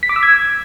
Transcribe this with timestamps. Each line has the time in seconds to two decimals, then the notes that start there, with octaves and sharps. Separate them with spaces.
0.03 B6
0.09 D6
0.16 E6
0.23 G#6